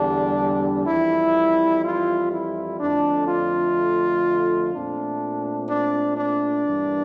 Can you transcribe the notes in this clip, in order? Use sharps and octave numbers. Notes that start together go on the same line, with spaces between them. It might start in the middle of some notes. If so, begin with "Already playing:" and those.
Already playing: E2 D3 G3 D4
F2 E3 G3 E4
F4
E4
F2 D3 A3 D4
F4
A#2 A3 C4 D4
D4
D4
G2 E3 A#3